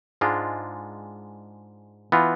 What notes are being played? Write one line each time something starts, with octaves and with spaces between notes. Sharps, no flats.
G#2 G#3 D4 F4
E3 B3 F4